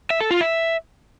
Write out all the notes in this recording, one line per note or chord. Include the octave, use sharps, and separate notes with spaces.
E5
A4
F4
E5